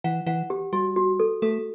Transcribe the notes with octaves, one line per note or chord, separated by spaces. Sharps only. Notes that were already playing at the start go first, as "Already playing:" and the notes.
E3 F#5
E3 F#5
G4
G3 F#4
F#4
A4
A3 A4